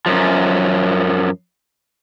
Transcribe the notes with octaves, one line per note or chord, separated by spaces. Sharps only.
F#2 F3